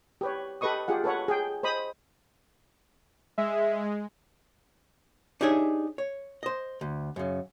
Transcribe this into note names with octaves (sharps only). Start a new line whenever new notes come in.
G4 B4 C#5
G4 A4 B4 D#5 C#6 D#6
F4 G4 G#4 F#5
A4 B4 C#5 F#5
G#4 G5
C5 D#5 B5 D#6
G#3 E5
D4 D#4 G4 G#4 C#5 E5
C#5
C5 D#5
D2
F#2 C#3